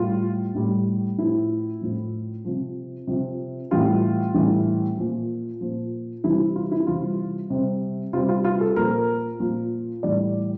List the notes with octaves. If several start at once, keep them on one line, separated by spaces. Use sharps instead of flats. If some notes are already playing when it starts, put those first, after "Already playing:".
Already playing: A2 G3 F4
A2 G3
A2 F3 E4
A2 F3
C3 F3
C3 F3
A2 E3 G3 F4
A2 E3 G3
A#2 F3
A#2 F3
C3 E3 G3 E4
E4
F4
E4
C3 E3 G3 F4
C3 G3
C3 G3 F4
F4
F4
A4
A#2 F3 A#4
A#2 F3
A2 E3 G3 D5